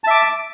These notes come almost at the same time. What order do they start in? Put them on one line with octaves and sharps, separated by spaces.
A5 E5 D6